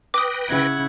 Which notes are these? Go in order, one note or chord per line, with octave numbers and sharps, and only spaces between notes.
B4 G5 D6 D#6 A#6
C#3 E4 F#5 G#6